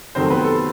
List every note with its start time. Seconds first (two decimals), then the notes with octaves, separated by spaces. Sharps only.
0.15 F2 C3 D#3 F#3 A3 C4 C5
0.30 B3 B4
0.44 A4